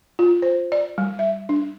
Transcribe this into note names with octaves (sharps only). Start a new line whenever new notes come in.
F4
C5
D5
G3
E5
D4